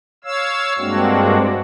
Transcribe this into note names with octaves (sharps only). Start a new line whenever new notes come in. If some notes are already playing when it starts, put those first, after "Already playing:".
C#5 F5 E6
G2 G#3 A#3 C4 D4 F#4